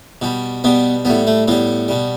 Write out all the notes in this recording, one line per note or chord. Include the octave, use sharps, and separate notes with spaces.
B2 G3
B2 G3 B3
A2 G3 B3
A3
A2 G3 B3
B2 G3